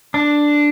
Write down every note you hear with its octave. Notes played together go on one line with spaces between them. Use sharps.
D4